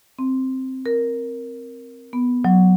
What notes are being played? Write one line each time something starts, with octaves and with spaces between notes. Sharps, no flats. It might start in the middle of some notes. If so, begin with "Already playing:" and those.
C4
A#4
B3
F#3